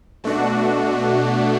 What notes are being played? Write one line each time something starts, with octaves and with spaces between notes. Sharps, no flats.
B2 A3 D4 F#4